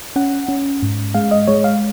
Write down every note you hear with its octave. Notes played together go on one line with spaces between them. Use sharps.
C#4 F#5
C#4
G#2
G#3 F5
D#5
G#3 C#5
F5